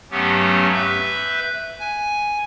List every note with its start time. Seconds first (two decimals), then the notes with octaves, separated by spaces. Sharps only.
0.11 G2 F#3 A3 B3 C#4 G4
0.73 B4 E5 G6
1.79 G#5